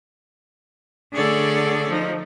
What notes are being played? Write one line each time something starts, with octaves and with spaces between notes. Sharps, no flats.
D3 A3 G#4 A4 C#5 D5
F3 D#4